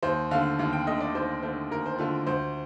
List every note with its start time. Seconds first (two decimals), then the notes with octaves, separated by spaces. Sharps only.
0.03 D#2 C5
0.31 D3 A3 F5
0.59 D#2 F5
0.73 G5
0.87 D3 A3 D#5
1.00 D5
1.15 D#2 C5
1.43 D3 A3 C5
1.71 D#2 A#4
1.86 C5
1.98 D3 A3 F4
2.27 D2 C5